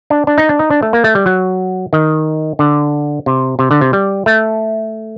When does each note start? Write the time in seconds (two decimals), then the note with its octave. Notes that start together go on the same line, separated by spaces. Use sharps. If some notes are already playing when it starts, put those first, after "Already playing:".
0.10 D4
0.27 D4
0.38 D#4
0.49 D4
0.59 D#4
0.70 D4
0.83 A3
0.93 A#3
1.04 A3
1.15 G3
1.26 F#3
1.93 D#3
2.59 D3
3.26 C3
3.59 C3
3.71 D3
3.81 C3
3.93 G3
4.26 A3